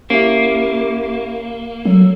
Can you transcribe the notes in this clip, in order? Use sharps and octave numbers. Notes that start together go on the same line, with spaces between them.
A#3 C#4 E4 G4
F#3 A4